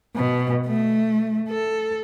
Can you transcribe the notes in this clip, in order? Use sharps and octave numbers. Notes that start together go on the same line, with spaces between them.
B2
A3
A4